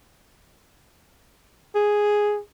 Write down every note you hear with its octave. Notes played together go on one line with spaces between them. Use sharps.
G#4